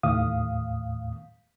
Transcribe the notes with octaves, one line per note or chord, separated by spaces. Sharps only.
D#2 A2 F5 D#6